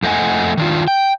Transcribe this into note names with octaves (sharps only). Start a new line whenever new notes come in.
F2 A3 C5 D#5 F#5 G#5
D#3 D4 F4
G5